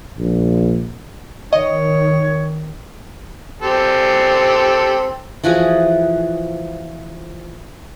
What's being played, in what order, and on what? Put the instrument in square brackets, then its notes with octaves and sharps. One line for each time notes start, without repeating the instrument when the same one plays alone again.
[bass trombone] A#1
[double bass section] D#3 [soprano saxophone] C#5 [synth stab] D#5
[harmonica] C4 G4 A4
[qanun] E3 F3 F#4 G#4